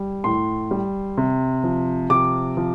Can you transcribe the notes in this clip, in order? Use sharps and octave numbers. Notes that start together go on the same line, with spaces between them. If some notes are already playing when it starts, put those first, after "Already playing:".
Already playing: G3
A2 C6
G3
C3
F3
C3 D6
F3